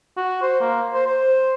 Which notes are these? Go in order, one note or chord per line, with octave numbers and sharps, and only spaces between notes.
F#4
C5
A#3
C5
C5